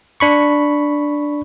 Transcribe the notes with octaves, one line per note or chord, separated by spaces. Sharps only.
D4 B5 C#6